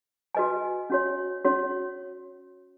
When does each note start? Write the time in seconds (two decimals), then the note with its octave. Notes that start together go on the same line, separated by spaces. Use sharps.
0.35 F#4 B4 D#5 G#5
0.90 C#4 F#4 C#5
1.44 C#4 F#4 C#5